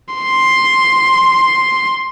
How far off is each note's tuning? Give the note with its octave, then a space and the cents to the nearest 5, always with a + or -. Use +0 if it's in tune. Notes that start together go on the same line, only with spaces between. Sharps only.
C6 +5